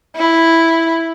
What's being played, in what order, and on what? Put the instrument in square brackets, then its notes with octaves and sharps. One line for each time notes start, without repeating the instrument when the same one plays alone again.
[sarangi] E4